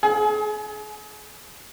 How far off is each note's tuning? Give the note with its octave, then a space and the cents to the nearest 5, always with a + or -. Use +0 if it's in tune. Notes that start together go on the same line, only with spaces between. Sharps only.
G#4 +35